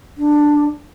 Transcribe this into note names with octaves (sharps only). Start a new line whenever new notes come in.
D4